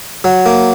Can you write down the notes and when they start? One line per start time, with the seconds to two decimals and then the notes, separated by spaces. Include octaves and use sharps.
0.24 F#3
0.46 A#3